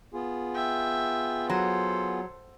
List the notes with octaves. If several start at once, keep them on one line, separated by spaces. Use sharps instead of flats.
B3 F4 G#4
E5 G5
F#3 A4 C5